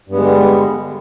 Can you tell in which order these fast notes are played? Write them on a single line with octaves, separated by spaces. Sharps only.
G2 B3 G#3 D3 G3